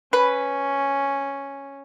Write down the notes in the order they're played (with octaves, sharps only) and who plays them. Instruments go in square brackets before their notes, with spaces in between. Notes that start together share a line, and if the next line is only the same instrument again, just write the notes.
[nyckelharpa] C#4 [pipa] B4